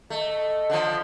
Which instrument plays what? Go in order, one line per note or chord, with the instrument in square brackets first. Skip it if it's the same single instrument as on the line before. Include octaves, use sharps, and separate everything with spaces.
[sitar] A3 [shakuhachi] D#5
[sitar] D3 F3